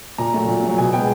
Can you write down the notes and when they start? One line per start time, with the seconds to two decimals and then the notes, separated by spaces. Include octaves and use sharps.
0.18 A#2 A#5
0.34 F#3 A3
0.48 A#2
0.63 F#3 A3
0.78 B2 G#5
0.93 G#3 B3 G5